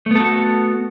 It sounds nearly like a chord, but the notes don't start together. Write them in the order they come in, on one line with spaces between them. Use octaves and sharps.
A3 B3 A4 F#4